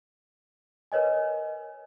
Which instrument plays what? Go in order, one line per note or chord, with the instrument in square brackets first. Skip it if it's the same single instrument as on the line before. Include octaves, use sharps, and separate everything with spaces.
[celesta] A#4 B4 C#5 D#5 G#5